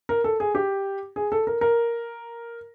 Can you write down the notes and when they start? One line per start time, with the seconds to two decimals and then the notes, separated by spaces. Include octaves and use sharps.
0.09 A#4
0.24 A4
0.40 G#4
0.55 G4
1.16 G#4
1.32 A4
1.47 A#4
1.61 A#4